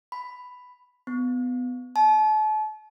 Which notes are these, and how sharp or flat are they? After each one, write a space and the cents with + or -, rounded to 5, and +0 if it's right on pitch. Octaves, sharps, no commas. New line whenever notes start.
B5 +5
B3 +20
A5 -40